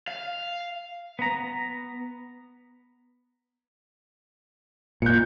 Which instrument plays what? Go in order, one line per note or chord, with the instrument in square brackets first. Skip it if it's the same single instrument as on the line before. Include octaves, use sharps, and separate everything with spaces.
[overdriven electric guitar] F5
[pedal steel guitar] B3 A#5
[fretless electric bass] A#2 [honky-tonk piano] G6 C#7